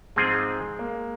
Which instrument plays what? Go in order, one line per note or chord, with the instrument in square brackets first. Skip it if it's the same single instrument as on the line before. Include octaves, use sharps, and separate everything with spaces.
[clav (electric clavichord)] G#2 F3 C4 F4 G#4 [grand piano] G#3
[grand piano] A#3